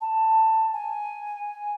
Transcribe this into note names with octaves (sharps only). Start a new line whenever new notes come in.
A5
G#5